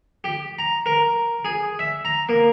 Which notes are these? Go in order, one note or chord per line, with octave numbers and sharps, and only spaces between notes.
G4
A#5
A#4
G#4
E5
A#5
A#3